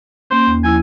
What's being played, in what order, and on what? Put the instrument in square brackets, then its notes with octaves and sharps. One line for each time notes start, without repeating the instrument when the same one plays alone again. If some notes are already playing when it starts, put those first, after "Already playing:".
[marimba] A#3 C#4 [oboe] C5
[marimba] D#2
[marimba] F3 E4 E6 [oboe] G#5